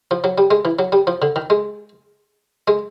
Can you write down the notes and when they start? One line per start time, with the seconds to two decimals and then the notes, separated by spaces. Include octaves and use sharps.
0.11 F3
0.24 F#3
0.38 G3
0.51 G#3
0.65 E3
0.79 F#3
0.92 G3
1.07 F3
1.22 D3
1.36 D#3
1.50 G#3
2.68 G#3